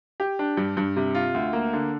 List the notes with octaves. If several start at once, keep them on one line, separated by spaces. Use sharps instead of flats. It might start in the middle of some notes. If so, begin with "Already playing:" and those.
G4
D4
G2
G2
C3
F4
D2
A#3
D3